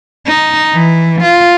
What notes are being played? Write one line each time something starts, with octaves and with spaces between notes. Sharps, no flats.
D#4
E3
F4